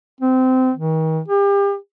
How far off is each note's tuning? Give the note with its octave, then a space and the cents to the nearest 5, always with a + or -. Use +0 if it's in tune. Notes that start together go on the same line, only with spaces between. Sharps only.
C4 -20
D#3 +40
G4 +35